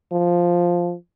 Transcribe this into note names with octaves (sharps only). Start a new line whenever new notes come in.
F3